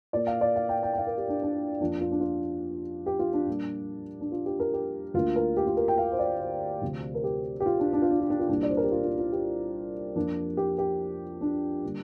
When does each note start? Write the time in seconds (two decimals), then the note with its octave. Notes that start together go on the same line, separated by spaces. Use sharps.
0.13 A#2 A#3 D5
0.27 F5
0.41 D5
0.56 F5
0.69 G5
0.83 G5
0.93 G5
0.98 F5
1.07 A#4
1.18 G4
1.28 D4
1.42 D4
1.80 F2 F3 A#3 D4
2.01 F4
2.11 D4
2.20 F4
3.06 G4
3.19 F4
3.33 D4
3.47 A#2 G3 A#3
4.20 D4
4.32 F4
4.46 G4
4.60 A#4
4.74 G4
5.14 D2 D3 A#3 F4
5.36 A#4
5.57 G4
5.67 F4
5.77 A#4
5.88 G5
5.98 F5
6.12 C5
6.19 D5
6.39 C5
6.82 D2 C3 F3
7.15 A#4
7.24 G4
7.60 G4
7.66 F4
7.79 D4
7.93 D4
8.02 F4
8.11 D4
8.20 F4
8.30 D4
8.39 F4
8.48 C2 A#2 A#3 D4
8.63 D5
8.69 C5
8.77 A#4
8.83 G4
8.91 F4
9.04 F4
9.19 F4
9.32 G4
10.15 F2 F3 A#3 D4
10.57 G4
10.78 G4
11.41 D4
11.84 D3 G3 A#3